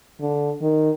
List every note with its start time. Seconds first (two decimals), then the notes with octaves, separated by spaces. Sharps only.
0.21 D3
0.61 D#3